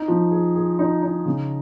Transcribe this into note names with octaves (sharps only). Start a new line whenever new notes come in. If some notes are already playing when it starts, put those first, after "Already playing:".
Already playing: D#4
F3
G#4
G#4
D#4
D#4
C#3